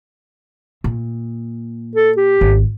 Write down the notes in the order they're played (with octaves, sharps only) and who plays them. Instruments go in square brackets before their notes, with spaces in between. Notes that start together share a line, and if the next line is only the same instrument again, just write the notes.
[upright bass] A#2
[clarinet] A4
G4
[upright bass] G#1